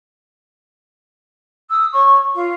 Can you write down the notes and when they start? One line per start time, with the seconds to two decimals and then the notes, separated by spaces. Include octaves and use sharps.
1.69 D#6 E6
1.92 C#5 C#6
2.32 F4